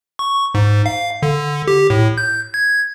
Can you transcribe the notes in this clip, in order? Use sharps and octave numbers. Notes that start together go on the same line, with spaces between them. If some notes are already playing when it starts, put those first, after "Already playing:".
C#6
G#2
F5
D3
G4
A2
G6
G#6